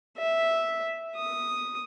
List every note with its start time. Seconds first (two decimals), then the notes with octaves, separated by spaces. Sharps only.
0.17 E5
1.16 D#6